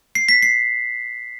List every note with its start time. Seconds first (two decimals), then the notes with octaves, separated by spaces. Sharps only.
0.15 C7
0.29 B6
0.42 C7